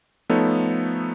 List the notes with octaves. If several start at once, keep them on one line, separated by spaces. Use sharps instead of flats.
F3 A3 B3 D#4 A4 C#5